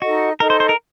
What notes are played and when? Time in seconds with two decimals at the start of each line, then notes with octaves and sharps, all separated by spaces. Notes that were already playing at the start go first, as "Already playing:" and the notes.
0.01 D#4 F#4 A4 D#5
0.40 D#4 A4 A#4 D#5
0.50 C5
0.60 C5
0.69 A#4